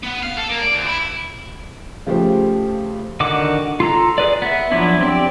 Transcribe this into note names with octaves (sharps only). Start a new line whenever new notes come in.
B3
F5
A4
A#3
D5
D2
E4
C#3 F3 A3 G4 C5
D3 D#3 F#4 D6
F4 A4 A#5
G#4 B4 D5
B3 E5
F3 F#3 B3 D4 E4
C4 G4 D5